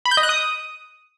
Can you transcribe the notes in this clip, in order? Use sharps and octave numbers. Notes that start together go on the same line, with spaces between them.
B5
G6
D#5
F#6
D#6